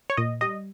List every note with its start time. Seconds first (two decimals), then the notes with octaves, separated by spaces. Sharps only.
0.10 C#5
0.17 A#2 D#5
0.41 G3 D#5